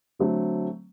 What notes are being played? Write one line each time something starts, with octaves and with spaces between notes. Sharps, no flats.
D3 F#3 A3 C4